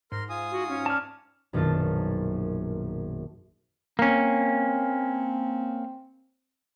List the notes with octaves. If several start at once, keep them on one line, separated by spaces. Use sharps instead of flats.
G#2 A#4 C6
F4 G#5 D#6
F#4
C#4
D5 A5 F6
A#1 F#2 B2 D#3 F4 A5
A#3 C4 C#4